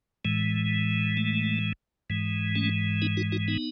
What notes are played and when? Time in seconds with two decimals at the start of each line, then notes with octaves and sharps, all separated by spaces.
0.25 A2 E3 G#3
1.17 A3
2.10 G#2 E3 G#3
2.55 A3 C#4
3.02 B3 D#4
3.17 D#4 F#4
3.32 D#4 F#4
3.48 B3 D#4